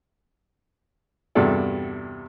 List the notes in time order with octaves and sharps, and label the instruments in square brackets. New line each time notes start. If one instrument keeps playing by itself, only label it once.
[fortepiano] E2 G2 C3 F#4 A4 D5